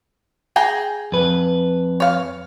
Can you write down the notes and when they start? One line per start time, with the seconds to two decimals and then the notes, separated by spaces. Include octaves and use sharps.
0.56 G#4 G5 A#5
1.12 F2 B4
2.00 C#5 F5